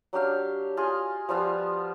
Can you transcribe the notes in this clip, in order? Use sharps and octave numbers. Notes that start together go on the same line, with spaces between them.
F#3 D4 G4 F5
F4 G#4 D#5
F3 G3 B3 F4